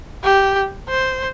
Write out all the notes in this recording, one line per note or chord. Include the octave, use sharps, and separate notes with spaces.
G4
C5